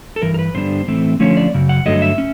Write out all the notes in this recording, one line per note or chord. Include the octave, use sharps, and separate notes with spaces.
A4
G2 E3 A#4
A#4
B4
G2 D3 G3 B3 D4 C5
A2 E3 A3 C4
D3 F3 A3 C#4 C#5
D5
F#2 C#3
F#5
G2 D3 F#3 A3 D#5
E5
C#4